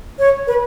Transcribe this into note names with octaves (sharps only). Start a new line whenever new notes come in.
C#5
B4